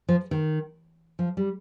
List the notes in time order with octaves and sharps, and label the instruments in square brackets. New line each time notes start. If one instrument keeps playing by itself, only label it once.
[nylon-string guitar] F3
D#3
F3
G3